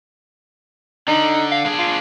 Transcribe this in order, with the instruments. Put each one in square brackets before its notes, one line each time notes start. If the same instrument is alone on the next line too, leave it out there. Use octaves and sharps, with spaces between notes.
[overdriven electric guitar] D3 [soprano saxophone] D#4
[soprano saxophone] F5
[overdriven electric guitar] D4 G#4
[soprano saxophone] F4